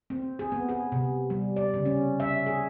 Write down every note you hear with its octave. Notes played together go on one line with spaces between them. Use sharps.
C4
G#4
B3
G#4
C3
G3
D5
C#3
C#4
E5
G#4